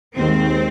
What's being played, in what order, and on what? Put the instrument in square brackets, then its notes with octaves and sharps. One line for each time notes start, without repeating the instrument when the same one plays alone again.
[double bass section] D#2 D#3 G#3 [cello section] C4